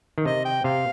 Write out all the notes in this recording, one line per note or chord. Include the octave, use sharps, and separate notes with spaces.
D#3
C3 D#5
G5
C3 F5